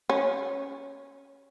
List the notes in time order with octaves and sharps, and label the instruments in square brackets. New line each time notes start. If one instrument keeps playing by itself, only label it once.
[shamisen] C#4